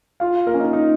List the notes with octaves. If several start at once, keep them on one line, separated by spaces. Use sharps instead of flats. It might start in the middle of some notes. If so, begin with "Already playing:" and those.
F4 F5
A#3 A#4
C#4
D#4
D#4